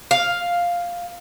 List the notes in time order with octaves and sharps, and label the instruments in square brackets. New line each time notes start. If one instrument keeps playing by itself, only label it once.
[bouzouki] F5